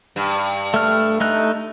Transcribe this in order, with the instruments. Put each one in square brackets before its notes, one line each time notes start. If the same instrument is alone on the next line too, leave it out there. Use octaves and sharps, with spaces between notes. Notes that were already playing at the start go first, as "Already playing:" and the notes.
[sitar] G2
[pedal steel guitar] A3 F6
A3 D#4 F#6